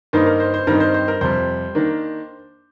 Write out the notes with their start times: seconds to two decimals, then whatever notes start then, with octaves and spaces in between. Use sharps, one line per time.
0.13 G2 D#3 A#3 D#4 C5
0.26 A#4
0.40 C5
0.54 C5
0.67 G2 D#3 G3 C4 D#4 A#4
0.80 C5
0.94 C5
1.08 A#4
1.21 F2 C3 G3 C5
1.75 D#3 A#3 D4